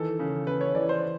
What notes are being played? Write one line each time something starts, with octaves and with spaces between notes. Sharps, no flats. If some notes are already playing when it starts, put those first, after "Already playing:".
Already playing: D#3 E3 A4
C#3
C#3 B4
C#5
E3 D5
C5